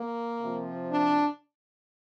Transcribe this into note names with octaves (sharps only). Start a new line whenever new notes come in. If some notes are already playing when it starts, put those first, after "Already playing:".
Already playing: A#3
C3 F3
D4